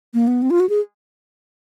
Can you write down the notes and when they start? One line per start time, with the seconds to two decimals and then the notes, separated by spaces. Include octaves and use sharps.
0.14 A#3
0.27 B3
0.42 C4
0.50 F4
0.60 F#4
0.69 G#4